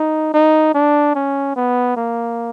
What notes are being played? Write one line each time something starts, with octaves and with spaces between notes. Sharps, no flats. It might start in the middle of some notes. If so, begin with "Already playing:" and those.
Already playing: D#4
D#4
D4
C#4
B3
A#3